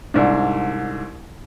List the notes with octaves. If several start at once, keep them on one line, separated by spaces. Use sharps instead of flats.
C2 G#2 D4